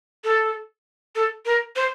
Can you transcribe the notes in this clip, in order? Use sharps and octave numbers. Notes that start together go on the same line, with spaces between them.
A4
A4
A#4
C5